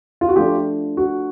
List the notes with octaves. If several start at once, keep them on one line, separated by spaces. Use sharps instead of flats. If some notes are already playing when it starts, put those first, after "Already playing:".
F4
F#4
F3 A3 D4 F4 G4
F#4